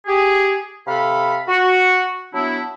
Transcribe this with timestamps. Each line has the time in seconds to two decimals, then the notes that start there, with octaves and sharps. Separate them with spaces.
0.06 G4 G#4
0.87 C3 A4 F5 B5
1.48 F#4
2.34 F#3 B3 D4 E4